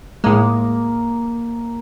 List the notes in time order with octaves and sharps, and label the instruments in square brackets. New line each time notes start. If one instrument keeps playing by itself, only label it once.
[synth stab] A2 G#3 [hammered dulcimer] A#3